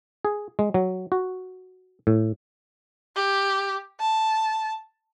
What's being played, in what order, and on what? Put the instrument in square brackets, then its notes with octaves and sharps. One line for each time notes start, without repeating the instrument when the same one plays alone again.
[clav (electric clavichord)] G#4
G#3
F#3
F#4
A2
[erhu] G4
A5